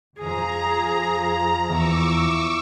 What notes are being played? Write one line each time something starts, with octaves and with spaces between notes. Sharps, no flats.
F2 F3 G#4 A#5
E2 C#6 D6 E6